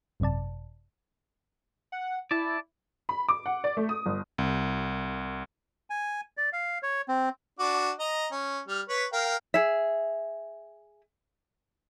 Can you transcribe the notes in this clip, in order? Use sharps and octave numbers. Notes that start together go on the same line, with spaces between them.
G#1 F#2 C3 D5 A5
F#5
E4 D5 A5
B5
D6
F#5
D5
A3
D#6
G1
C2
G#5
D5
F5
C#5
C4
D4 F#4 D6
D#5 A#5
C#4
G3 F6
B4 C#5
A#4 F5 G5
G#4 E5